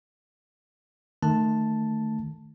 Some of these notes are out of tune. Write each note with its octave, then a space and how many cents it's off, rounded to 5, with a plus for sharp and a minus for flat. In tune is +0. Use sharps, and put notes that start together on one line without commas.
D#3 -25 A3 +0 A5 +0